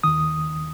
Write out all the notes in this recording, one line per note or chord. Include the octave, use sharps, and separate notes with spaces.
D#2 D#3 D#6